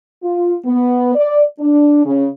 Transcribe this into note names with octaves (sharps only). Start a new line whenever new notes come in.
F4
B3
D5
D4
C#3